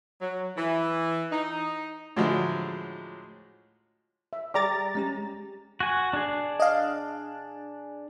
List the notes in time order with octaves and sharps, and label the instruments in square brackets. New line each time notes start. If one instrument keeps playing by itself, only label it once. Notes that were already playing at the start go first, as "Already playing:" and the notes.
[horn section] F#3
E3
D#4
[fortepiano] A2 D3 F3 F#3 G#3
[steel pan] E5
[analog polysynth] G3 A#5 A6 [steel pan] G#4 D5 D6
[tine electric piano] G#3 C#4 G4
[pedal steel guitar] F#4 G#5
D4 G#4
[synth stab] D#5 F5